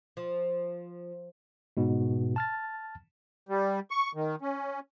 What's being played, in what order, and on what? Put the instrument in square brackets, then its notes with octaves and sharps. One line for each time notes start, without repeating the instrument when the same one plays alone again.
[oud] F3
[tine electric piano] G#2 B2
A5 F6 A6
[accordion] G3
C#6
D#3
C#4